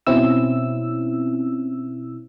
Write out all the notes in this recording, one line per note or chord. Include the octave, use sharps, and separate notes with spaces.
B2 C4 C#4 E4 E6